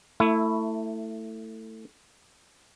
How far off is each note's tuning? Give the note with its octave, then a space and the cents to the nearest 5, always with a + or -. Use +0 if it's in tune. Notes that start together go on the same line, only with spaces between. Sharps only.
A3 +20 E4 +0